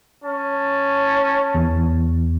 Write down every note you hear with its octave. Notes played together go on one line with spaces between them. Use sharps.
C#4 A5
E2